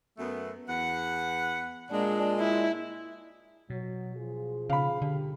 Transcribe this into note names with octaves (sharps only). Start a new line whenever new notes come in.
F#2 A3 B3
E2 B4 F#5
A#2 G#3 D4
E4
B2 F#3
F3 F4 G#4
C#3 F5 B5
G2 D3 G4